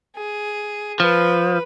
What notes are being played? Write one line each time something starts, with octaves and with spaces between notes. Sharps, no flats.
G#4
F3 B4